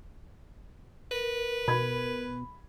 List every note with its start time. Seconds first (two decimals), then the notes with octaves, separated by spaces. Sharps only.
1.11 A#4 B4
1.68 B2 B5 G#6